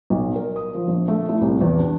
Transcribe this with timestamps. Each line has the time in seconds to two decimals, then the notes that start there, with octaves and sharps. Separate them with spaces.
0.10 B1
0.36 A#4
0.56 D#6
0.74 F3
0.88 A#1
1.08 A3
1.29 E4
1.41 C2
1.61 E2
1.79 D4